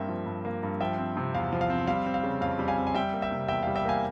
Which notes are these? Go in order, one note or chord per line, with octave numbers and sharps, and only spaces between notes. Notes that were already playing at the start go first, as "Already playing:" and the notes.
Already playing: G2 A#3 C4 E5 G5
F3
G2
A#3
G2
F3 E5 G5
C4
C3
E2 F5
F3
F5
C4
G3 F5
C4
F5
C#3
F2 F5
G3
F5 G#5
C4
G#5
G3 E5 G5
A#3
E5 G5
C3
E2 E5 G5
G3 F5
E5 G5
A#3 F5 G#5